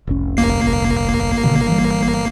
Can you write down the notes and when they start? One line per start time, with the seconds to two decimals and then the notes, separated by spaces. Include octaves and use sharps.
0.07 F1 C2 C#4
0.37 G1 A#3 C7
1.44 B2 D3 D#3
1.68 E3 G3